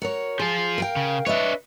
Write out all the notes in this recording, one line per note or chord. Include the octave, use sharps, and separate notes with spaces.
F#4 A#4 C#5
F3 F4 G#4
A#4 F5 G5
C#3
D4 B4 C#5 D#5 E5